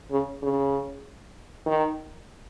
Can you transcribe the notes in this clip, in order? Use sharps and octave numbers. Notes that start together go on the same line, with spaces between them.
C#3
C#3
D#3